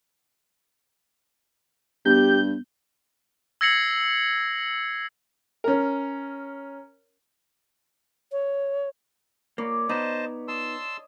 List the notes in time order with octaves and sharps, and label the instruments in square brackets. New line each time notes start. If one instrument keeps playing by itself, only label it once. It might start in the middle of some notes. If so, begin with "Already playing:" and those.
[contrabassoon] G2 [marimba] B3 [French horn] G4 [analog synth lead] G6
[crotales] E6 G#6 A#6 C7 C#7 F#7
[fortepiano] C#4 A#4
[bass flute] C#5
[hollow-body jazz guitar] A#3 [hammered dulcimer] C#5 D5 B5
[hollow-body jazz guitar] B3 D#4 [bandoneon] C5 D#5 A5
[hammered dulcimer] D#5 [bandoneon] A5 C6 E6